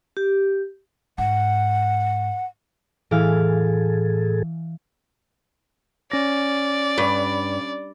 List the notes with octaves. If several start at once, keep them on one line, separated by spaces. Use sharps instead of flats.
G4
G#2 F#5
A2 E3 G#4 A4 F5 G#5
C#4 D5 A#6
G2